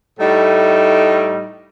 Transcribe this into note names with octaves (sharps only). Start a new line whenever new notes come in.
A2 G3 A3 D#4